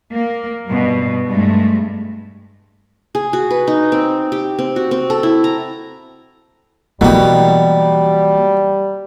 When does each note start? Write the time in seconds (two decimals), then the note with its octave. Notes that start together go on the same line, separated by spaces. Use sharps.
0.12 A#3
0.68 G2 B2
1.28 G2 G#3 A3
3.15 G#4
3.33 F#4
3.50 B4
3.68 D#4
3.92 C4
4.32 G4
4.59 C4
4.76 F#4
4.91 C4
5.10 A4
5.23 E4
5.44 A#5
7.01 B2 E3 F#3 G3 A#3 G4